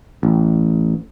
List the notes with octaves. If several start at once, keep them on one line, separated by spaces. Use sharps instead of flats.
A1